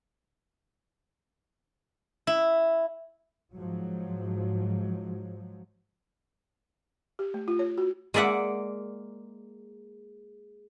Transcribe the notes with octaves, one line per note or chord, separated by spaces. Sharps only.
E4
G#2 F3 F#3
G4
A3
F4
C#5
F#4
G#3 A#3 D5 E5 F#5